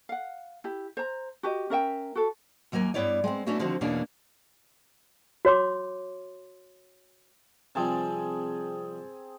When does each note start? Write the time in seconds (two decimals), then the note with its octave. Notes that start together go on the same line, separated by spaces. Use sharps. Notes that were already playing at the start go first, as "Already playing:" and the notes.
0.09 F5 F#5
0.64 E4 G4
0.97 C5 A#5
1.43 F#4 G4 D#5
1.70 C#4 A#4 E5 G5
2.15 F#4 A4
2.72 D#2 F#3 A#3 A#4 G#5
2.94 G2 F3 B3 E4 C#5 D5
3.24 G#3 B3 C4
3.46 A3 B3 C#4 D4 E4 F#4
3.59 D3 D#3 F3 C4 F#4
3.81 E2 B2 E3 A#3 C#4 D4
5.45 F#4 C#5 C6 D6
7.75 C3 F3 G3 C4 G#4 A5